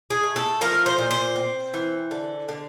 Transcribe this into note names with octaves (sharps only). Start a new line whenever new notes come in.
G#4
A3
A4
F3 A#4
C5
A#2
C5
C4
E3
D3
D3